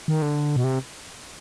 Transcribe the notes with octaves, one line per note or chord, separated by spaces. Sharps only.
D#3
D3
B2
C3